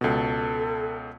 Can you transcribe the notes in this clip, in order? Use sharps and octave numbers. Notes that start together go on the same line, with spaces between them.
C#2 B2 A4